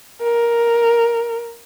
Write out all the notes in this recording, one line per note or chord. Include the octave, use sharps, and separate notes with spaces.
A#4